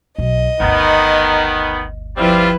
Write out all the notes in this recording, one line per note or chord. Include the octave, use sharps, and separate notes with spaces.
B1 D#5
G1 D2 D#3 B3
F3 G3 C4 E4 F4 B4